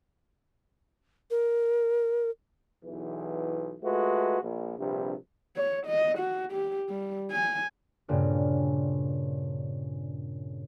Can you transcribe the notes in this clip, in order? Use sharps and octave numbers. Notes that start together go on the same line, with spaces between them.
A#4
B1 E2 E3
G#3 A3 F4 F#4 B4
A#1
A#1 G2 C3
C#5
D#5
F#4
G4
G3
G#5
G2 A#2 C#3 A#3 C4 D4